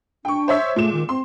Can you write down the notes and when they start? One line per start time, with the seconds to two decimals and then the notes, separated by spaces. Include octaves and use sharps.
0.25 D4 G5 C#6
0.48 C5 C#5 E5
0.76 A#2 G#3 A3 E7
0.93 D#3
1.09 C4 C6